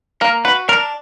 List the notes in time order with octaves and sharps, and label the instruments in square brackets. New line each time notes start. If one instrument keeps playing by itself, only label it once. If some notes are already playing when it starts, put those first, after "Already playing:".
[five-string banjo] A#3 [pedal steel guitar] A#4
[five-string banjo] F#4 [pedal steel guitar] B4
[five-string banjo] D4 [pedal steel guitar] A#4